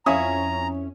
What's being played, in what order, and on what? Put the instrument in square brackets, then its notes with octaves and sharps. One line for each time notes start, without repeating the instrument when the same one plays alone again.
[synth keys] F2 C#4 [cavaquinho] E4 C#5 [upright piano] F5 G#5 D#6 [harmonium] A#5